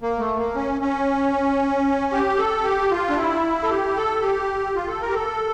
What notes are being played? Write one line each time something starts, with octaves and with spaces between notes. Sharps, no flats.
A#3
A3
A#3
C#4
C#4
G4
A4
G4
F4
D4
E4
A4
G4
A4
G4
F4
A4
A#4
G4
A4